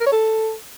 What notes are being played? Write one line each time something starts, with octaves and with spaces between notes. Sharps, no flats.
A#4
C#5
A4